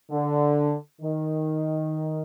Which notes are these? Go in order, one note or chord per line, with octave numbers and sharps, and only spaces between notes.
D3
D#3